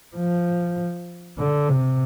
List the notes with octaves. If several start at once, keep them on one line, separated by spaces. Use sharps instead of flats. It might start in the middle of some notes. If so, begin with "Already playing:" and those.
F3
D3
C3